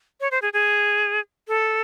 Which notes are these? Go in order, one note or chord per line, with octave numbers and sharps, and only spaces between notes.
C#5
C5
G#4
G#4
A4